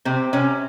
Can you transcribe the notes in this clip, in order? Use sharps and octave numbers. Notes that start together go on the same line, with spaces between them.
C3 C4
C3 C#4